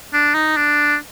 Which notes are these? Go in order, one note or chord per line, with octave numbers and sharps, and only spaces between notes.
D4
D#4
D4